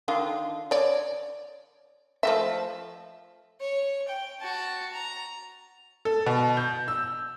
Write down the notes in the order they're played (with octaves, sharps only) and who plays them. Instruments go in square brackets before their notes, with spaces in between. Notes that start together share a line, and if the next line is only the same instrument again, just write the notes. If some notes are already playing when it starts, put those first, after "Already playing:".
[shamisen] D3 D#3 F4
C#5 D5
F3 A3 E5
[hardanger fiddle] C#5
G5
F#4 A5
A#5
[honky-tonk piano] A4
B2
G6
E6